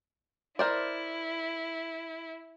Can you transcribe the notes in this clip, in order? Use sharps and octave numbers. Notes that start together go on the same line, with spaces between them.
E4 A#4 C5 D5